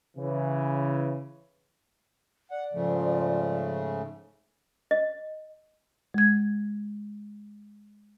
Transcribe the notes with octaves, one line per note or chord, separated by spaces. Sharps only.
C#3 E3
D5 F#5
G#2 C#3 F3 A3
D#5
G#3 G#6